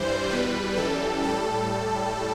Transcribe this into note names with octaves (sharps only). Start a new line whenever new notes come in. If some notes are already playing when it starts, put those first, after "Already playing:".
Already playing: G2 E3 G3 C5
E2 B2 G3 B4
F#2 E3 G3 A4
A2 G3 A4